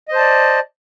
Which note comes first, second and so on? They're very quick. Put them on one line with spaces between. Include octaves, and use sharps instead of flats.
D#5 C5 A5 D5